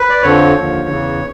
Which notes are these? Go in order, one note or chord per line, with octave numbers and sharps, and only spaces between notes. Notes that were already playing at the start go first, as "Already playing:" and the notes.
Already playing: B4
D5
F2 D3 F3 C#5
D#2 D3 F3
E2 C#3 E3